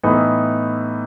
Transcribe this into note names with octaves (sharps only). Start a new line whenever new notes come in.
A2 E3 B3 D#4